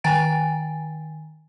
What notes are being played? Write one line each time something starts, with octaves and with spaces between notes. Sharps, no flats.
D#3 G5 G#5 A#5 A6 D7